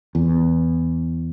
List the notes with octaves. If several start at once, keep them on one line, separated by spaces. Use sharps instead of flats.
E2